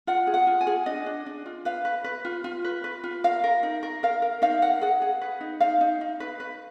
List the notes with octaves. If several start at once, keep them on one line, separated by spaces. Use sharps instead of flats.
F4 F#5
G#4
F#5
F4
G#5
G#4
D4 D#5
D4
D4
F4
B4 F5
B4
B4
F4
F4
B4
B4
F4
A#4 F5
A#4
D#4
A#4
A#4 F5
A#4
D#4 F5
A#4 F#5
G#4 F#5
G#4
B4
D#4
D#4 F5
D#4
D#4
B4
B4